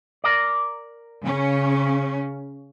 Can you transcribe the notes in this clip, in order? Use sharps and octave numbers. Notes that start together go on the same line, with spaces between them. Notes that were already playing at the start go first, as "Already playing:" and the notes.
A#4 D5
C#3 C#4